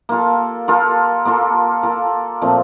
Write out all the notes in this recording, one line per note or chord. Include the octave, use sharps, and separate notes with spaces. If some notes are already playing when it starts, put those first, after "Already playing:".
A#3 F4 A4
A#3 F4 A4
A#3 F4 A4
A#3 F4 A4
A#2 F3 A3 C4